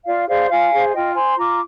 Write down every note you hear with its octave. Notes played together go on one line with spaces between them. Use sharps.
F4 D5 F5
G#4 C5 D5 F5
F4 F5 G#5
G#4 C5
F5
F4 D#5 G5
C5 G#5 C6
F4 A#5 D6